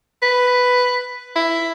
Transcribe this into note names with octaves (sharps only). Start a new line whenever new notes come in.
B4
E4